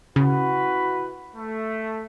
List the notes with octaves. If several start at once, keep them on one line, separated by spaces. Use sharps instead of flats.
C#3 E4 F#4 B4
A3